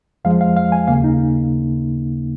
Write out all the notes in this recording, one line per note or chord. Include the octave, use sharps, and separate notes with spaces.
F2 F3 G#3 F5
F5
F5
G#5
D#2 C#3 A#3 F5
D#4